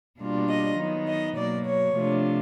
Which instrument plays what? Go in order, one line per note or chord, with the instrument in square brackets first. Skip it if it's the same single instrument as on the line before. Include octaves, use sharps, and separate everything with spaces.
[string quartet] B2 G3 A#3 D4 F4
D#5
D#3 F#3 B3 D#4
D#5
B2 F#3 A#3 D5
C#5
C3 F3 A3 D4 F4